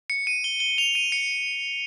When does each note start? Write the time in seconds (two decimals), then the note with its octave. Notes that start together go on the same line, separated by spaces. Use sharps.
0.10 C#7
0.27 D#7
0.44 G7
0.60 G7
0.78 F7
0.95 D#7
1.12 C#7